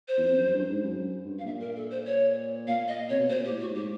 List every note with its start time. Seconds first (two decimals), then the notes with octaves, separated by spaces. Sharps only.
0.08 C5
0.18 E2
0.23 F2
0.38 F#2
0.54 G2
0.69 G#2
0.84 F#2
1.25 G2
1.39 F5
1.45 A#2 E5
1.60 A#4
1.76 A4
1.91 C5
2.06 C#5
2.68 A#2 F5
2.88 D#5
3.09 C3 C#5
3.19 B2
3.29 A#2 C5
3.45 G4
3.49 A2
3.61 F#4
3.70 G#2 G4